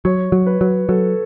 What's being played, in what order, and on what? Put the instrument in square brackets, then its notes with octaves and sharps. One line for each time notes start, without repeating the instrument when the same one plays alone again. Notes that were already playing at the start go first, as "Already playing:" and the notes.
[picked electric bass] F#3 [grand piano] C#5
[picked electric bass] F#3
[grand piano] B4
[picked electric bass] F#3
[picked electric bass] F#3 [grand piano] A4